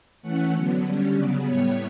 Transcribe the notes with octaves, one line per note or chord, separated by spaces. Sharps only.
E3 A3 C#4 F#5
D3 F#3 B3
D3 G3 C#4
C#3 F#3 B3 D5
A2 G3 B3 C#5